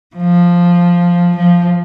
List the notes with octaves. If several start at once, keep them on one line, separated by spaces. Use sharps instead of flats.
F3
F3